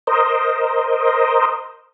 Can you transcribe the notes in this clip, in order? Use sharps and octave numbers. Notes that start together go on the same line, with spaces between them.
A#4 C5 D#5